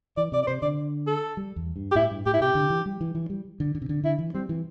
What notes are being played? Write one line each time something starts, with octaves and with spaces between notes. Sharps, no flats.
E3 D5
C3 D5
D5
C3 C5
D3 D5
A4
G3
E2
G2
G4
A2 E4
G2
A2 G4
E4
C3 G4
D3
E3
G3
E3
E3
G3
D3
D3
C3
D3
D3 E4
E3
G3 C4
E3